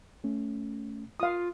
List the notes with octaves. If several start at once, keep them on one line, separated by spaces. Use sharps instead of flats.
A3 C#4
F4 F5 D#6